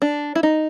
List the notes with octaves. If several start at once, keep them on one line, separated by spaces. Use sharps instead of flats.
D4
E4
D#4